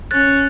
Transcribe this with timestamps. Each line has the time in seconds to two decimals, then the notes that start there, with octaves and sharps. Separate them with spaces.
0.11 C#4 F#6 A6